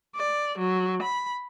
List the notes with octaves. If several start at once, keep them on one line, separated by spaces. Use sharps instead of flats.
D5
F#3
B5